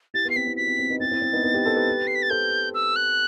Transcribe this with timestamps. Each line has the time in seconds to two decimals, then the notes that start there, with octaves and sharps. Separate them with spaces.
0.14 E4 G4 A6
0.25 B3
0.30 C7
0.36 C4 B6
0.47 C4 E4
0.57 D#4 F#4 B6
0.68 C4
0.79 C4
0.90 B3 D#4
1.00 C4 E4 A6
1.11 C4 E4
1.22 C4
1.33 B3 D#4
1.43 B3 D#4
1.54 G4 B4
1.65 A4 C5
1.76 G4 B4
2.07 C7
2.15 B6
2.22 A6
2.30 A4 C5 G6
2.74 E6
2.96 F#6